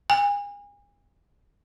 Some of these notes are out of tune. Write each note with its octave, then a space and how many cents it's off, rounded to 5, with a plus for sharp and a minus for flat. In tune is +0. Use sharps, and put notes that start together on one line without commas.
G#5 -35